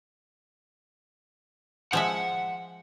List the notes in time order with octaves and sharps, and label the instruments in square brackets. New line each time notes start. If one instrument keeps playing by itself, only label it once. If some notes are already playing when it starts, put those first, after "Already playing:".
[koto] F3 G#3 E5 [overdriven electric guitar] F#5